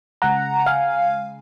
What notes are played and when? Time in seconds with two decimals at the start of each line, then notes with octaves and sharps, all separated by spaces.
0.22 C#3 G#3 F#5 A#5
0.66 F5 G#5